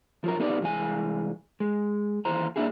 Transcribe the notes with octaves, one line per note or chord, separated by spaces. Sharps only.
F3 F#3 A#4
B3 D#4 G4 B4 D5
C2 E3 G#3 G#5
G#3
D#2 E3 C5 A#5
G3 A#3 D4 E4 F#4 G#4